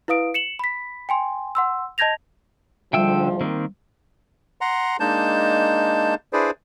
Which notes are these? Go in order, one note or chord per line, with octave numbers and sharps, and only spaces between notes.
E4 B4 F5 D#6 D7
C#7 E7 F#7
B5 B6
G5 G#5 C6
F#5 C6 E6
D#5 A5 G6 G#6 A#6 F7
D2 G#2 D3 F3 G3 E5 G5 E6
D#3 A#3 C4
F#5 A#5 C6
G#3 A#3 D4 D#4 A5 G6
D4 E4 G#4 B4 C5 D5